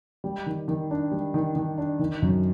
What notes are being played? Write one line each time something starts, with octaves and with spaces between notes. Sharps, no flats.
G3
D#3
D#3
D4
G3
D#3
D#3
D4
D#3
F#2